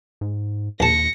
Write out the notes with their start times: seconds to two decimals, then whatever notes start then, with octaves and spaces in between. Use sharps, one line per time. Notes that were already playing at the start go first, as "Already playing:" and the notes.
0.21 G#2
0.80 A#1 D#2 A5 A#6 C#7